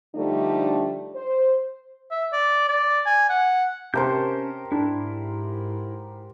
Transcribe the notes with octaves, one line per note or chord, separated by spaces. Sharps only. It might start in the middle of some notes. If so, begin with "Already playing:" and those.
D3 F3 G3 A3 D4 D#4
C5
E5
D5
D5
G#5
F#5
C3 C#4 G4 A#4 C5 A5 G6
G#2 D4 E4